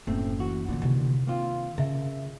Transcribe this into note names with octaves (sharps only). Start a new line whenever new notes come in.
F#1 A2 A3 C4
E3 F#4
D2 A#2 E3 D4 E4
C3 D#3
A#3 C4 F4
C#3 A#4 E5